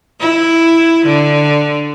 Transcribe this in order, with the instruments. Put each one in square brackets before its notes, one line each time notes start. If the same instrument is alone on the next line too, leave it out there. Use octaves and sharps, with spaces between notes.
[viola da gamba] E4
D3